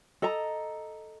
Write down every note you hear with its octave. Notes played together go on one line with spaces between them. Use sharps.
A4 D#5 A#5